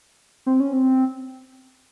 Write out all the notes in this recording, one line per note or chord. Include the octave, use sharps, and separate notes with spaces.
C4
C#4
C4